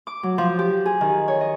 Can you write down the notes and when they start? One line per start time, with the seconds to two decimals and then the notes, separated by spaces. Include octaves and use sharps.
0.07 D6
0.23 F#3
0.38 F3
0.59 G4
0.86 G#4
1.01 D#3
1.28 C#5
1.41 D#5